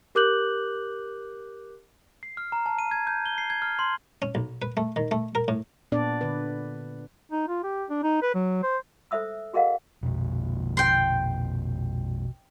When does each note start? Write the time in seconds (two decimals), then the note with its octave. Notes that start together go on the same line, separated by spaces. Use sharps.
0.15 G4 A#4 D6 F#6 G6 F#7
2.23 C7
2.37 F6
2.52 A#5
2.66 A5
2.78 D#7
2.91 G#6
3.07 G6
3.26 G7
3.38 C7
3.50 G#6
3.62 F6
3.79 C6
4.22 C#4
4.35 B1
4.62 B4
4.77 A3
4.96 D#3
5.11 A3
5.35 A#4
5.48 A2
5.92 A#2 B3 D4 D5
6.21 D3 B4
7.32 D#4
7.48 F4
7.63 G4
7.90 D4
8.03 D#4
8.22 B4
8.34 F#3
8.63 C5
9.11 A4 C5 E5 D#6 E6
9.53 F#4 G#4 A#4 D#5 F5 F#5
10.03 A#1 F2 B2
10.77 G5 C6